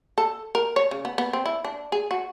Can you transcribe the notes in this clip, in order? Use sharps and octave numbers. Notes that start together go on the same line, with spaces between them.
A4
A#4
C#5
C#3
B3
B3
C4
E4
D4
G#4
F#4